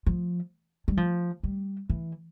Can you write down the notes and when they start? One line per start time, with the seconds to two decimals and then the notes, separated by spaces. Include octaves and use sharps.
0.06 F3
0.88 G3
0.97 F3
1.43 G3
1.90 E3